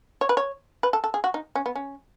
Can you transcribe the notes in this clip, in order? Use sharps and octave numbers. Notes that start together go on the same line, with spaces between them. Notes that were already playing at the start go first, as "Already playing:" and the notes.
C#5
B4
C#5
B4
A4
A4
G#4
F#4
D#4
C#4
B3
C#4